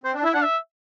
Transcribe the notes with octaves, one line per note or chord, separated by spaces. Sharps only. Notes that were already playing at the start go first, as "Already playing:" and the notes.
C4 C5
D4
E4 E5
D4 F#5
E5